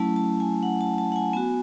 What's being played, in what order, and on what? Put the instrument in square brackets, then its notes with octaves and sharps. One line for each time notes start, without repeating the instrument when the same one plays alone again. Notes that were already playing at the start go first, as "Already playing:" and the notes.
Already playing: [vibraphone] F#3 A3 C#4 E4 A5
A5
G#5
F#5
A5
A5
F#5
G#5
B3 F#4 G#5